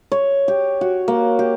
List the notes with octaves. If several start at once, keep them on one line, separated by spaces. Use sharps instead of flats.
C#5
G4
F#4
A#3
G4